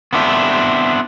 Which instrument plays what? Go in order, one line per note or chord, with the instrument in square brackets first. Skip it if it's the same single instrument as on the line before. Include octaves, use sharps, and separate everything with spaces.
[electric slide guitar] B3 C4 D4 E4